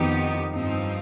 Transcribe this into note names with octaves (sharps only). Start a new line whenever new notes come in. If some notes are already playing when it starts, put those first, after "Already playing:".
Already playing: F2 D#3 B3 D#4 G4
G2 F3 C4 D#4